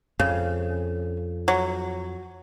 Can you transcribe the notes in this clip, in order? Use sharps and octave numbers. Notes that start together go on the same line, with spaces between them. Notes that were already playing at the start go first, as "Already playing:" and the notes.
F2 C#3
F#3